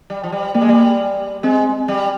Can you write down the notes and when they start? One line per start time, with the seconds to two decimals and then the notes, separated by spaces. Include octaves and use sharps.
0.10 G3
0.23 F3
0.32 G3
0.54 G3 A#3
0.62 G#3
0.69 G3
1.43 G#3 C4
1.88 G3